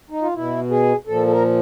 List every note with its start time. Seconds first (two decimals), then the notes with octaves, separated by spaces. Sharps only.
0.10 D#4
0.22 F4
0.35 B2 E4
0.71 G#4
1.07 A#2 F3 A4
1.27 A4
1.31 A#4